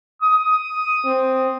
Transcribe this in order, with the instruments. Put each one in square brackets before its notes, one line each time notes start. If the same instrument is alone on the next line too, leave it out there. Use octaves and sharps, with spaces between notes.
[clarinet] D#6
[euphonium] C4